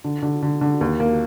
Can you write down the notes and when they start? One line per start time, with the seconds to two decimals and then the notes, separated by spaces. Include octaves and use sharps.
0.04 D3
0.23 D3
0.43 D3
0.61 D3
0.81 D#2
1.00 A#3